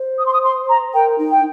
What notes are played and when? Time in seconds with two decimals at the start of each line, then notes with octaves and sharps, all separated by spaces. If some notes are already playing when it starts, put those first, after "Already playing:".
Already playing: C5
0.18 D#6
0.26 C6
0.33 D#6
0.44 C6
0.69 A#5
0.94 A#4 G5
1.18 D#4
1.31 G5